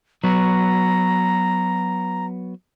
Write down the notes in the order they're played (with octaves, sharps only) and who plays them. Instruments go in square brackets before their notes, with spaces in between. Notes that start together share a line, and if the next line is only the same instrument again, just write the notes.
[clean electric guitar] F#3 B3 F#4 [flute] A#5